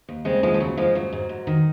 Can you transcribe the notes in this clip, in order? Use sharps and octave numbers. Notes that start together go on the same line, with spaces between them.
D#2
C#3 G#3 C4
D#2 F3 G#3
F3
C#3 F#3
C#3 F3 G#3
G#2 F#3
G#2
G#2
D#3